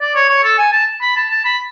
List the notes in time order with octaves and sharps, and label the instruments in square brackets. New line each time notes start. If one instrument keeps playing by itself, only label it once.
[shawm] D5
C#5
C#5
A4
G#5
A5
B5
A5
A5
B5